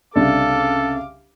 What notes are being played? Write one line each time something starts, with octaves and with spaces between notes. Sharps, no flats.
C2 C#3 D4 A4 F5 D6